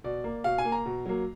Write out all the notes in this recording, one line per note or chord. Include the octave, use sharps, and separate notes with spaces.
B2 D5
A#3
B2 F5
G#5
A#3
A#5
B2
F#3 A#3